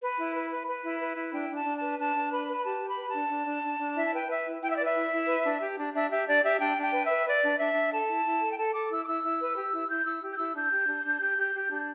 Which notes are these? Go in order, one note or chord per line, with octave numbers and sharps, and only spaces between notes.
B4
E4
B4
B4
B4
E4
B4
E4
D4 G5
D4 A5
D4
B4 A5
D4 A5
D4
B4 B5
B4
B5
G4 A5
G4
B5
B4
A5
D4
D4
D4
D4
D4
E4 E5
A5
B4 G5
B4 E5
E4
E4 G5
E5
D5
B4 E5
E4
E4
B4
D4
G4
D4
D4 E5
G4 E5
D4 D5
G4 E5
D4 G5
D4
G5
B4
E5
B4
B4 D5
D4
D4 E5
D4
A4 A5
E4
E4
A4
G5
A4 A5
A4 D6
E4 E6
D6
E4 E6
E4
B4
G4
E4
E4 G6
E4 E6
G4
G6
E4 E6
D4 G6
G4
D4
D4
G4
G4
G4
D4